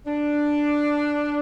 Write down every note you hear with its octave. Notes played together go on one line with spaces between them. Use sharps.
D4